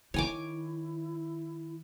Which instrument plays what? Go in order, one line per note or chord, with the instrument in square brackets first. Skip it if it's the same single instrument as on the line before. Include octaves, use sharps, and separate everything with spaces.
[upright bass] D#3 [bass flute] E4 [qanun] C#5 G#5 D6